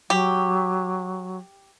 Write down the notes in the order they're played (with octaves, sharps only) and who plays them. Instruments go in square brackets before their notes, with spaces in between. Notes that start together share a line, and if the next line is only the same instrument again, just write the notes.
[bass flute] F#3 [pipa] G4